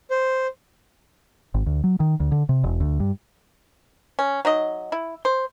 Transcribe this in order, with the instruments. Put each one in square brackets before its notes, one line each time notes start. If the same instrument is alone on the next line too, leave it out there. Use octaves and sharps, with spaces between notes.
[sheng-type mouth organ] C5
[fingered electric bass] G#1
D2
F#3
D#3
D2
D3
C3
E1
D2
G2
[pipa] C#4
F#3 D#4 D#5
E4
C5